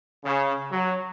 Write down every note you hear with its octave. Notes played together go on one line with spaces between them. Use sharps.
C#3
F#3